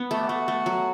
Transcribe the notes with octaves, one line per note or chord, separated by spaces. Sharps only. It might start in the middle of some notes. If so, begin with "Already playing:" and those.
Already playing: B3
A3 F#4
G4
A3 F#4
A3
F#3